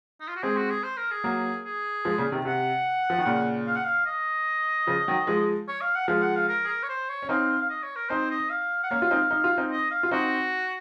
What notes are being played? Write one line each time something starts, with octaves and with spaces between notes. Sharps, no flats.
D#4
F4
F#4
G#3 C4 G#4
F#4
G#4
C5
A#4
G#4
F#3 A#3
G#4
F3 G#3
A#2 C#3
C3 D#3
C3 F#5
F3
D#3
A#2 C#3
F5
F#5
F5
D#5
C#3 F3
D#3 F#3
F3 G#3
C#5
F5
F#5
F3 G#3 F5
F#5
F5
A#4
G#4
A#4
C#5
C5
C#5
C#4
C4 D#4 F5
F5
D#5
C#5
A#4
C4 D#4 C5
D#5
F5
F#5
A#3 C#4 F5
F4
C4 D#4
D#4
F4
C4 D#4
D#5
F5
F4
C4 D#4 F#4